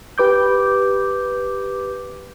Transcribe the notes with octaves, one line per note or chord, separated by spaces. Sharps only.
G4 B4 D6 G6